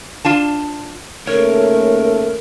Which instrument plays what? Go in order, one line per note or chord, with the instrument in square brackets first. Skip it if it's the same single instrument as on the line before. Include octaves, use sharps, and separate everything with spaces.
[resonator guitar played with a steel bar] D4 F4 A5
[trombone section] D#2 C#3 A3 [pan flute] A#4 [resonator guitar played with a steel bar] C#5